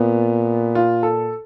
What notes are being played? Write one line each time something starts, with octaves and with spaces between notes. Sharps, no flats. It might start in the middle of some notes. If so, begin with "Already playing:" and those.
Already playing: A#2 B3
F4
A4